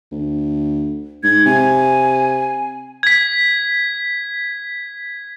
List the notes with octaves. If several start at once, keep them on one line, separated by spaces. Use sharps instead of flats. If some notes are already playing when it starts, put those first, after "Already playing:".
D2
G#2 G#6
C3 G#5
G#6 B6